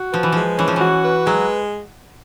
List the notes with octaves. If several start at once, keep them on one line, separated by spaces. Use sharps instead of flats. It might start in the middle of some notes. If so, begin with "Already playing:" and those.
Already playing: F#4
F3 B4
E3
F3 G#3
E3 C#4
F3
E3
F#4
B4
F#3 G#3